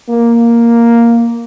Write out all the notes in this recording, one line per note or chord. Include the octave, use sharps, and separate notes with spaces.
A#3